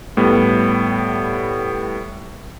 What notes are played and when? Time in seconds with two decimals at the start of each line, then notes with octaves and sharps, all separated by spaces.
0.17 A2 G3 B3